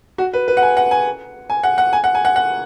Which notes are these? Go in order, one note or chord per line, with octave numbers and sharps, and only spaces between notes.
F#4
B4
B4
F#5
G#5
F#5
G#5
G#5
F#5
F#5
G#5
F#5
G#5
F#5
F#5